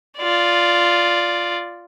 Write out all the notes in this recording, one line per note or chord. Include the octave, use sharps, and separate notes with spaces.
F4 D5